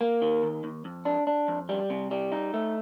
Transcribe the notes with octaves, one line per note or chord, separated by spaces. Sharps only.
A#3
D#3
D#2
D#2
F2
D4
D4
F2
G3
C3
G3
D#4
A3